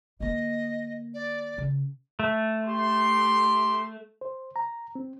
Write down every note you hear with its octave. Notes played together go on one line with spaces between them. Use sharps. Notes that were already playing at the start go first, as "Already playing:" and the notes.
D3 A#3 D#5
D5
C#3
A3
G4 C6
C5
A#5
C4